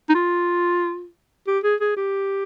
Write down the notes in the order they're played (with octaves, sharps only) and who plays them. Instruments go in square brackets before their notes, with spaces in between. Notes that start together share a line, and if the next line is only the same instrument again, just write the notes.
[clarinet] D#4
F4
G4
G#4
G#4
G4